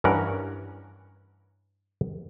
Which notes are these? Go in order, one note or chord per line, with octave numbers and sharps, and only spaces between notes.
G2 E3 C#4 A#4 F#5